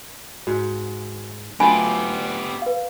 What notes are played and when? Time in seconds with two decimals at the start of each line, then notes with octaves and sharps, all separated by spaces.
0.47 G#2 F#4
1.60 F#3 A3 B3 F4 G4 G#5 B5
2.62 B4 F5